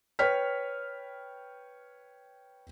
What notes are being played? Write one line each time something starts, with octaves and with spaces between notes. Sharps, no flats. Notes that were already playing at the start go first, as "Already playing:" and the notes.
B4 C#5 G5 F6 B6